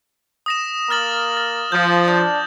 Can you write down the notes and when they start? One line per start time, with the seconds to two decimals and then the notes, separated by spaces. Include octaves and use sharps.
0.46 D#6 A#6 E7
0.90 A#3 F6 A6 F#7
1.37 A6
1.72 F3 G6
2.06 D4 D#6 G6